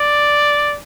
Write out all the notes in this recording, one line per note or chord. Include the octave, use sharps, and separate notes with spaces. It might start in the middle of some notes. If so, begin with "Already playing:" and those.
Already playing: D5